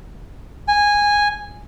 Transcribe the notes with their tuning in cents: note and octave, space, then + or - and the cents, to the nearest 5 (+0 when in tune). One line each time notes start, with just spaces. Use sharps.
G#5 -10